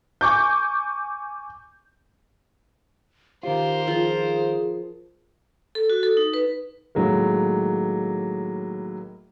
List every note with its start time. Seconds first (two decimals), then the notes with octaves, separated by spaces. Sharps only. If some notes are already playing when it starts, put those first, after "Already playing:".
0.21 G#5 C#6 D6 G6
3.43 D#3 F4 G4 A#4 C5
3.88 F3 G#4
5.75 A4
5.90 F#4
6.03 A4
6.17 D#4
6.34 B4
6.95 A2 D#3 F#3 G#3 A#3